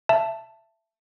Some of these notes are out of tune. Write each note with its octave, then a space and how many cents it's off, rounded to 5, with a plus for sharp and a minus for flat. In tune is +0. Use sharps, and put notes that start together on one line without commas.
E5 +20 A5 +5